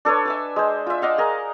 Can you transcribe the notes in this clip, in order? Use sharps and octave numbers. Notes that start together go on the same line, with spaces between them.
D4 A4 B4 C#5
E5 G#5 D6
G#3 C5
F4 E5
D5 D#5 F5 F#5
G#4 A#4